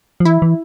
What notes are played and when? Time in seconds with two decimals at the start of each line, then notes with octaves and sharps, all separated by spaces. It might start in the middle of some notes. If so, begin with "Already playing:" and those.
0.20 F3
0.25 E3 E4
0.42 E3